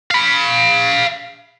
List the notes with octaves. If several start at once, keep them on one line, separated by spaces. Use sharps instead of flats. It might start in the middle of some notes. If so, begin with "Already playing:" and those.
F5 B5